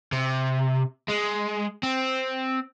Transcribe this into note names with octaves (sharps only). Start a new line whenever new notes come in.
C3
G#3
C4